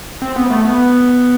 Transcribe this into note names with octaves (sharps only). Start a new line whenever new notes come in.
C4
B3
A3
B3